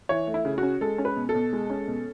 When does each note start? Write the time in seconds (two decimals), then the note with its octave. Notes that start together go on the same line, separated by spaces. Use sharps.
0.09 E3 C#5
0.27 A3
0.34 E4
0.45 C#3
0.58 C#4 F#4
0.81 G#3 A4
0.98 C#4
1.05 B4
1.16 B2
1.29 A4
1.35 B2
1.53 G#3
1.70 C#4
1.88 B2